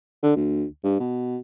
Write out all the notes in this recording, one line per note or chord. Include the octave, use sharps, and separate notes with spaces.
D3
D2
G2
B2